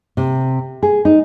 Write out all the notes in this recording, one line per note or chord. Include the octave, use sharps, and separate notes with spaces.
C3
G#4
D#4